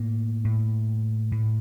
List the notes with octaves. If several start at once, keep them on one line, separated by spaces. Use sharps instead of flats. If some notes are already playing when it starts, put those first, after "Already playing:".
Already playing: A2 A#3
A2
A2